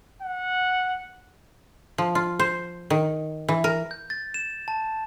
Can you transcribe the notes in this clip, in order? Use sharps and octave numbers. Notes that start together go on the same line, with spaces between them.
F#5
F3
F4
C5
D#3
E3
A#4
G6
A6
E7
A5